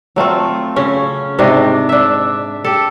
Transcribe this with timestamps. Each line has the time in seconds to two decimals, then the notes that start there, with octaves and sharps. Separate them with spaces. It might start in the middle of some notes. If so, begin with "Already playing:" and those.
0.16 F#3 A3 C4 F4
0.76 C#3 C#4
1.38 G#2 C3 D4 D#5
1.89 D4 E5
2.64 G4 A4